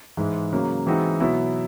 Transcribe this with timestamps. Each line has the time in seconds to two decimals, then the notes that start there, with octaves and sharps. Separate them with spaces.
0.17 G#2 E3 G#3
0.52 C#3 F#3 A#3
0.87 E3 G#3 C4 D#4 F#4
1.20 B2 F#3 B3 E4